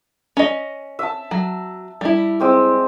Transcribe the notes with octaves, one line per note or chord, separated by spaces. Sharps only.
C#4 D#5
E5 A5
F#3
G3 E4
G#3 C4 D5